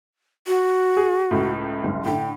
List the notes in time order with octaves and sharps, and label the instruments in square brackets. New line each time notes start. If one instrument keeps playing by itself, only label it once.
[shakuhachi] F#4
[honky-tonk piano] G#4
C#2 A2
F#1 C2 G#2
[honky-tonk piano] A2 D3 [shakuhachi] G5